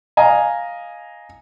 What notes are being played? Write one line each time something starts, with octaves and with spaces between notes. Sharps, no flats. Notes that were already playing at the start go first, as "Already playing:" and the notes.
D#5 F5 G#5 A#5